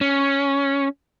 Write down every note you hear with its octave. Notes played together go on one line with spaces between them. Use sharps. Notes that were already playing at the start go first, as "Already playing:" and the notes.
C#4